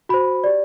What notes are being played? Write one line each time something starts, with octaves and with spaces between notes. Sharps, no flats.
F#4 C5 B5
G4 D5